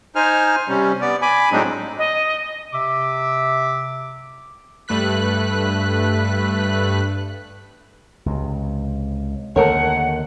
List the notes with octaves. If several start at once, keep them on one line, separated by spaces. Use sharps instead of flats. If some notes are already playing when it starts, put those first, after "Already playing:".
D#4 C5 G#5 F6
C3 G3 C#4
B3 D5
G#5 B5 D6
A2 F#3 G#3 C4 D4 D#4
D#5
C3 E5 D6
G2 A3 B4 F#6 B6
C#2 C3
D#2 D3 A3 A#4 C#5 F#5